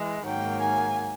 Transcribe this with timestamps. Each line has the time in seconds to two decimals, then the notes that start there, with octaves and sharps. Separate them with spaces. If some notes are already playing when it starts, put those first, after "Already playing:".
Already playing: E3 G#3
0.25 G#2 D#3 F#3 A#3 G5
0.61 G#5